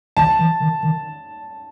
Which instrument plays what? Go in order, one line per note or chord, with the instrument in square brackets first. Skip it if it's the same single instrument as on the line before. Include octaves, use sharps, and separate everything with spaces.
[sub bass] D#3 [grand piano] A5
[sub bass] E3
D#3
D#3